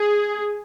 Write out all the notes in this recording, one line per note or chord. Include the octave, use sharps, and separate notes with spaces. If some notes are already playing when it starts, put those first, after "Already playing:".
Already playing: G#4